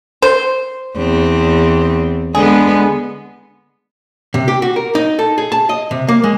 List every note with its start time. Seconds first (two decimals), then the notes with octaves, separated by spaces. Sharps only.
0.22 C5
0.96 E2 C4
2.35 D3 G#3 B3 G#4
4.34 C3
4.48 G4
4.62 F#4
4.76 A#4
4.95 D#4
5.19 A4
5.38 G#4
5.52 A5
5.69 D#5
5.91 C3
6.08 A#3
6.24 G#3